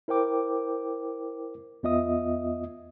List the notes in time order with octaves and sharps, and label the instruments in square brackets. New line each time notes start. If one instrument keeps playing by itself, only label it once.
[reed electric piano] E4 A#4 C5 G5 D6
E2 B3 F4 D#5 E5 D#6